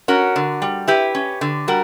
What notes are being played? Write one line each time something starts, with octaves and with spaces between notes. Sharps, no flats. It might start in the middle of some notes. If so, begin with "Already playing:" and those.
C#4 F#4 A#4
D3
G3
E4 G4 B4
C#4
D3
G3 F#4 A#4